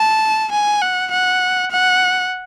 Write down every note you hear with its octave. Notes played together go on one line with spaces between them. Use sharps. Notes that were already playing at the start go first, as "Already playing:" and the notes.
Already playing: A5
G#5
F#5
F#5
F#5